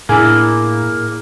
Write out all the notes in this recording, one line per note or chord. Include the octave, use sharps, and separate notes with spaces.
A2 A#3 D4 E4 G#4